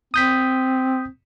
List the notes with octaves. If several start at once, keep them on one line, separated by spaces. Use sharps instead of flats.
C4 D#6 G6 B6